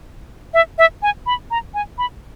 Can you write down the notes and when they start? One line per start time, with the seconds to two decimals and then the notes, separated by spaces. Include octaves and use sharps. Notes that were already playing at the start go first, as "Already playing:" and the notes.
0.54 E5
0.78 E5
1.02 G#5
1.26 B5
1.51 A#5
1.74 G#5
1.98 B5